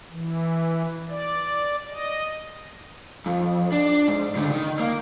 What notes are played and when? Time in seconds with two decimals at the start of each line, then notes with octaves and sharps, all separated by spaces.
0.11 E3
1.09 D5
1.89 D#5
3.26 F2
3.72 D4
4.08 G#2
4.36 C#2 D3
4.52 D#3
4.80 A#3